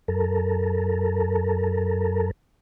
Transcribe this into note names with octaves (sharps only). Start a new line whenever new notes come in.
F#2 A4 A#4